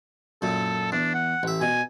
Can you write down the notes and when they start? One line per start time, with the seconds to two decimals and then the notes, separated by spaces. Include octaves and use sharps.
0.42 F#2 A#2 A4
0.92 E2 D4
1.14 F#5
1.43 A1 E5
1.61 B2 G#5